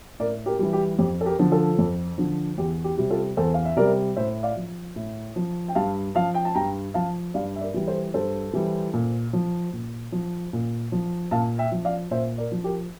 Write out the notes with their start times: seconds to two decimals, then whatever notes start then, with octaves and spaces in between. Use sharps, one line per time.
0.20 A2 A#4 D5
0.46 G4 A#4
0.59 E3 G3
0.73 G4
0.99 F2 G4
1.21 A4
1.26 G4 A#4
1.39 D3 F3
1.51 F4 A4
1.79 F2
2.18 D3 F3
2.58 E2 G4
2.84 G4
2.97 C3 G3
3.10 F4 A4
3.37 E2 A4 C5
3.54 F5
3.65 E5
3.76 C3 G3 A#4 D5
4.16 A2 C5 E5
4.43 D5 F5
4.56 F3
4.96 A2
5.36 F3
5.68 G5
5.75 G2 F5 A5
6.15 F3 F5 A5
6.34 G5
6.45 A5
6.55 G2 G5 A#5
6.94 F3 F5 A5
7.34 G2 D5 F5
7.56 E5
7.61 A#4 D5
7.74 E3 G3
7.88 A4 C5
8.14 G2 A4 C5
8.53 E3 G3
8.93 A#2
9.33 F3
9.73 A#2
10.12 F3
10.53 A#2
10.92 F3
11.31 A#2 F5 A5
11.58 E5 G5
11.72 F3
11.85 D5 F5
12.11 A#2 C5 E5
12.38 A#4 D5
12.52 F3
12.64 G4 A#4